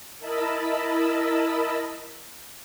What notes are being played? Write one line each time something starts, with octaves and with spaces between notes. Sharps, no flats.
E4 A#4 D#5 A5 B5 E6